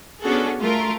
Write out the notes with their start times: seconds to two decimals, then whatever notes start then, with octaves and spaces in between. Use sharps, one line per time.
0.22 B3 C#4 D4 F#4 G#4 A4
0.58 A3 F4 A#4